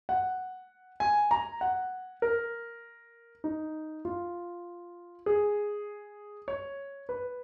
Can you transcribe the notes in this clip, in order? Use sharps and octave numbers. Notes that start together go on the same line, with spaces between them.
F#5
G#5
A#5
F#5
A#4
D#4
F4
G#4
C#5
B4